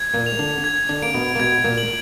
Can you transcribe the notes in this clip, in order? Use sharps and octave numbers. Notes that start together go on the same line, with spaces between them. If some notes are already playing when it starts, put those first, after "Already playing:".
Already playing: G#6
A#2 A#3
F7
D3 D4
G#6
D3 D4
A#3 D7
B2 B3
A#3
B2 B3 G#6
A#2 A#3
F#7